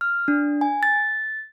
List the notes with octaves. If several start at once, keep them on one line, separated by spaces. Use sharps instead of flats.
F6
D4
G#5
A6